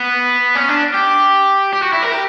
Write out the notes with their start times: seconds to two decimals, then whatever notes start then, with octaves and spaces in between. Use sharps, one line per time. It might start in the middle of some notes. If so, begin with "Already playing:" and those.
Already playing: B3
0.55 C#4
0.69 D4
0.94 G4
1.73 G4
1.83 F#4
1.93 E4
2.03 A#4
2.12 G4